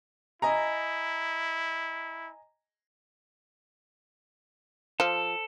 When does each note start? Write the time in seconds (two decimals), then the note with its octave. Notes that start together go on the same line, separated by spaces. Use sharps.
0.42 E4 D#5 G#5 A#5
5.00 F3 A4